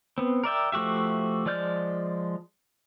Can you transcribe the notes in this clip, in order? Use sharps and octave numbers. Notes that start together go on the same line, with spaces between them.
B3 C4
A#4 D5 E5 G5
F3 A3 F#4 G4 E5
F3 G#3 D5 F6 G6